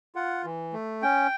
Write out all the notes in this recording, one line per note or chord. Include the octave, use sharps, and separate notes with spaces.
F4 F#5
E3
A3
C#4 G5